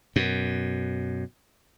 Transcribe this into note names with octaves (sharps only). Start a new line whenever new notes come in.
F#2 B2